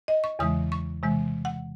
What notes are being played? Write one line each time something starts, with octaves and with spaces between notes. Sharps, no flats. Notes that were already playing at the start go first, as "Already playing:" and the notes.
D#5
C#6
E2 C#3 E3 G#3 D#6
C#6
C3 E3 G#3
F#5